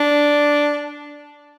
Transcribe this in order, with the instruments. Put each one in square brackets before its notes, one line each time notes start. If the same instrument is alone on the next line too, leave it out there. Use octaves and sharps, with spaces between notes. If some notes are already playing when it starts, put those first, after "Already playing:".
Already playing: [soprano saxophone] D4